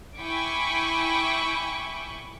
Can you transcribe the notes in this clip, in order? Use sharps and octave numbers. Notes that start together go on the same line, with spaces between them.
E4 G5 G#5 B5 C#6 D6